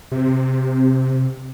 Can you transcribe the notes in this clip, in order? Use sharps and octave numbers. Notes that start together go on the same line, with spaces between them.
C3